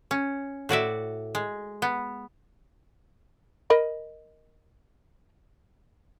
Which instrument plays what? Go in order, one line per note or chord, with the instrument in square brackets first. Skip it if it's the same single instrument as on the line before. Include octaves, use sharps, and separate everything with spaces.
[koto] C#4
A2 F#4 D5 E5
G#3
B3
[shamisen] A#4 D#5 B5